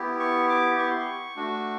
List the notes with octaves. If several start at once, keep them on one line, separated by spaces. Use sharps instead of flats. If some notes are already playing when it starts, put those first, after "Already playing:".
Already playing: B3 E4 G4
C#6
D6
C#6
C6
C#6
A3 D4 F#4